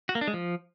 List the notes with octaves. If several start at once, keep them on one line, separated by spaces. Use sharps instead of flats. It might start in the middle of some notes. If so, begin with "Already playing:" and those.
F#4
A#3
D4
G#3
F3